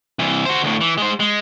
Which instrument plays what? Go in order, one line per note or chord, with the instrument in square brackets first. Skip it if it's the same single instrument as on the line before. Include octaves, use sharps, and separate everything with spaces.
[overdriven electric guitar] C2 E3
F#4 C5
D2 A2
E3
G#3 C5
G#3